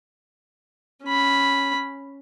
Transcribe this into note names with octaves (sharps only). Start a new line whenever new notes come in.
C#4 B5